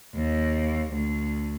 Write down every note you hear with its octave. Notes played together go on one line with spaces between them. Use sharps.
D#2
D2